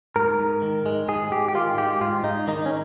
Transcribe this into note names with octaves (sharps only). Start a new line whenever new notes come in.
G#2 A#4
G#2
D#3
G#3
G#2 G#4
G#2 G4
G4
D#3 F4
G#3 G4
G#2 F4
G#2 D#4
D#3 D#4
C#4